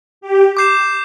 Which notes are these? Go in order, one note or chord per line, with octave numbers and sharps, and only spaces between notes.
G4
D6 G6 C7 E7